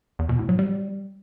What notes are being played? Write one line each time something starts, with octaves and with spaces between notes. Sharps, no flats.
E2
B2
A2
F#3
G3